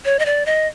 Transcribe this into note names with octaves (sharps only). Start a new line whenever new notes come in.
C#5
D#5
D5
D#5